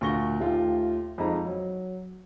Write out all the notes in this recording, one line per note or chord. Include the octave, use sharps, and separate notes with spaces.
D2 A#2 C#6 A#6 G7
D#2 A3 F4 G4
F2 G#3 D#4 A#5
F#3